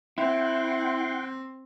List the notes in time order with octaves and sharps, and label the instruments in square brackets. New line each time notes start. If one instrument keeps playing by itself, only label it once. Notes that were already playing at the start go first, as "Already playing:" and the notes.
[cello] C4 [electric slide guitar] E4 [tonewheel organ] F#5 G5 C6